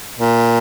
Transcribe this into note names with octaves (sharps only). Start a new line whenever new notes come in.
A#2